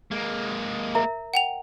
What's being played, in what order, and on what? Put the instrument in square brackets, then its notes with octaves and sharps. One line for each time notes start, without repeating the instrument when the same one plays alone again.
[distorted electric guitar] G#3 A#3
[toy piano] A#4 E5 A#5
[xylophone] F#5 G5 F7